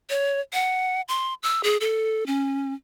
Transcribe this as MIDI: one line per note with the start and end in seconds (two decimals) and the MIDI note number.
0.10 0.40 73
0.53 1.01 78
1.08 1.34 84
1.43 1.62 88
1.64 1.77 68
1.81 2.27 69
2.27 2.73 61